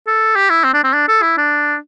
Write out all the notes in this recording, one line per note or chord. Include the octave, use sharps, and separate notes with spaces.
A4
G4
E4
C4
D4
C4
D4
A4
E4
D4